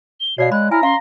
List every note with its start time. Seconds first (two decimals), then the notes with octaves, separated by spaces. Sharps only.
0.20 G7
0.38 B2 C#5 D5 F5 C7
0.52 G#3 B5 F#6
0.71 E4 G#5 A#5 F6
0.83 C#4 F5 C6